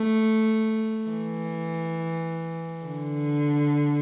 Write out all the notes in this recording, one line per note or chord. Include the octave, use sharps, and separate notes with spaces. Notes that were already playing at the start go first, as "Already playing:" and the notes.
Already playing: A3
E3
D3